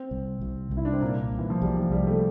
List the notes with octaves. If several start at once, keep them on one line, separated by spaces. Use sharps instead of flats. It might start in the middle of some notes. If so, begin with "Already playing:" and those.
Already playing: C4
C2
C2
C2
E4
D4
C4
A#2 A#3
C2
E3
F3
C2 G3
F3
C2 G3
A3